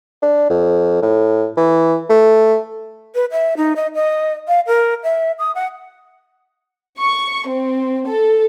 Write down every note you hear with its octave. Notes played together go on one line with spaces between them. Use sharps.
D4
F2
A2
E3
A3
B4
E5
D#4
D#5
D#5
F5
A#4
E5
D#6
F#5
C#6
C4
A4